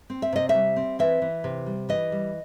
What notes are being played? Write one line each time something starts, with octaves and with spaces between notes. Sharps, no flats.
C4
E5
C3 D#5
G3 E5
C4
E3 E5
E3
C3
G3
E3 D#5
G3